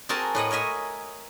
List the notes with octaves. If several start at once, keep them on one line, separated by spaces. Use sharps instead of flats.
C4 F#4 G#4 A#4 G#5 A5
A2 B4 D#5 F#5
A#4 C#5 D#5 E5 G#5